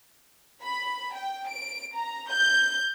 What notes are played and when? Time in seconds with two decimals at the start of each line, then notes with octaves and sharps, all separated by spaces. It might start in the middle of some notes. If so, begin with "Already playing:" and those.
0.62 B5
1.14 G5
1.48 D7
1.95 A#5
2.30 G6